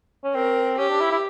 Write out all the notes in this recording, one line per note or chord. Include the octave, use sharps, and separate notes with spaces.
C#4
C4 A#4
C#4 G4
D4
E4
E4